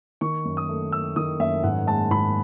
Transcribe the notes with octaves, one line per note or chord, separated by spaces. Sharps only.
D#3 C#6
F#2
D#6
A3
A3 E6
D#3 D#6
F#2 E5
G#2 F#5
G#3 A5
G#2 B5